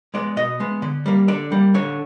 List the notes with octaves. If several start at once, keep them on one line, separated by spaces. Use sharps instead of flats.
G#3 B3 D5
B2 D#5
G#3 B3
D3
G3 A#3
D3 D5
G3 A#3
D3 C#5